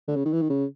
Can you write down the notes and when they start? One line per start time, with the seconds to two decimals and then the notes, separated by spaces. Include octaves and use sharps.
0.08 D3
0.16 C#3
0.25 D#3
0.33 E3
0.42 D#3
0.50 C#3